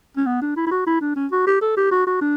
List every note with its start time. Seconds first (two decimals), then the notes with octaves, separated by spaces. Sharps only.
0.17 C#4
0.26 B3
0.42 D4
0.56 E4
0.67 E4
0.71 F#4
0.86 E4
1.01 D4
1.16 C#4
1.32 F#4
1.47 G4
1.61 A4
1.77 G4
1.91 F#4
2.07 F#4
2.21 D4